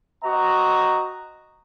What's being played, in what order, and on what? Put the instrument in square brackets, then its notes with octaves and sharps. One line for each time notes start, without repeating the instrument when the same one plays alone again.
[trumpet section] C4 F#4 D#5 A#5